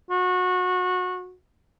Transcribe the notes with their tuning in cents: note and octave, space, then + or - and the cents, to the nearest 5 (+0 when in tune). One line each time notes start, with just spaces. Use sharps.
F#4 -25